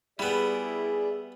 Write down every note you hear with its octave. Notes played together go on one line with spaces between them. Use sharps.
G3 B3 E4 G#4 D5 E5